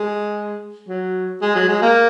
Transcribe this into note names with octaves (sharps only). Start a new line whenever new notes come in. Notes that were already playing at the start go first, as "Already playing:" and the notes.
Already playing: G#3
F#3
G#3
F#3
G#3
A#3